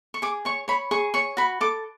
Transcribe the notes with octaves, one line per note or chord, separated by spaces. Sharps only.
C#6
G#4 D6
C#5 C#6
C#5 B5
G#4 C#6
C#5 C#6
F#4 B5
A4 D6